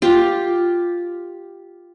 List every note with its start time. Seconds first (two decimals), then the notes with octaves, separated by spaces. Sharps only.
0.02 F4 G4